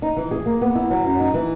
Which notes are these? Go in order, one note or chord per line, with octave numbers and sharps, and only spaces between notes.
D#4
E3
G#4
A#3
B3
E4
F#3
F#2
D#4
E3